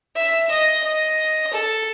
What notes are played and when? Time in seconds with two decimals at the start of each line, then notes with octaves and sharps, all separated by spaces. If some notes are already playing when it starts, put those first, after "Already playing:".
0.16 E5
0.50 D#5
0.84 D#5
1.53 A4